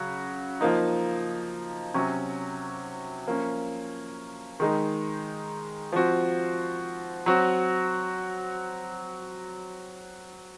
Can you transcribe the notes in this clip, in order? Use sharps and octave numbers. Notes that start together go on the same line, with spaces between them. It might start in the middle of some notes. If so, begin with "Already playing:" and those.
Already playing: C#3 F#3 F#4
F3 A#3 D#4
C3 F#3 C#4 F#4
F3 A#3 C#4
D#3 G#3 D#4
F3 C4 F#4
F#3 C4 F#4